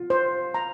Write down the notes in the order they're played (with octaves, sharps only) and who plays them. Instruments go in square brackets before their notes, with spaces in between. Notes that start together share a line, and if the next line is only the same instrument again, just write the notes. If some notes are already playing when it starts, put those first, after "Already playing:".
Already playing: [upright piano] F4
[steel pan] C5
A#5